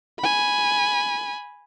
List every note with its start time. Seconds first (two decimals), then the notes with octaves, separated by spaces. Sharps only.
0.19 G#5 B5